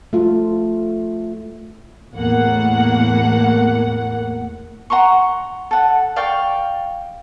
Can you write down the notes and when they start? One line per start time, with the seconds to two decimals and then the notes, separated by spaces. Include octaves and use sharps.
0.13 A3 F4
2.14 E2 A2 A#3 F#5
4.90 F#5 A#5 C6 C#6
5.71 A4 F#5
6.16 D5 F5 G5 C#6